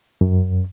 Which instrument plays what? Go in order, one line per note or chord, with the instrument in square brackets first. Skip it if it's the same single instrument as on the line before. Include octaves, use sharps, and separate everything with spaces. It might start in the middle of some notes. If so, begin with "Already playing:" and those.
[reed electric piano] F#2